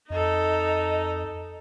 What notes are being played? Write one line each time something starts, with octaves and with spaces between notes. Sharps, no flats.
F2 D#4 A4 D#5